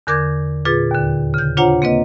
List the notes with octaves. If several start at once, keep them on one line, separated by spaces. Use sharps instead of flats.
E2 D3 A#4 D6 G6 G#6
A#2 F4 G#4 B4 A6
D#2 D3
C#3 G6
D4 F4 C5 C#5 F#5 A#5
A#3 C4 B4 D#5